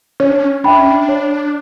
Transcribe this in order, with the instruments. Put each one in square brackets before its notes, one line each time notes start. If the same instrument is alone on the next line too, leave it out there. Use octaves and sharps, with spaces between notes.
[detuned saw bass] C#4 [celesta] C#5
[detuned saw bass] D4
C#4
[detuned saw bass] D4 [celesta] E5 G5 B5
[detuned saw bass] C#4
D4
[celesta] C#5